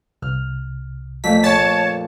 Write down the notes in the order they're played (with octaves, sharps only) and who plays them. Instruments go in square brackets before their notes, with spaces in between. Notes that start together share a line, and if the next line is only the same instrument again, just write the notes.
[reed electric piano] C2 [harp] F6
[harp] F2 A#2 A3 [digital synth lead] B6
[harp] A#2 [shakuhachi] C#5 [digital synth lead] A5